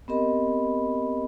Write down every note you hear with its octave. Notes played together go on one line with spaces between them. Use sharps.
B3 C4 G4 A#4 D#5 B5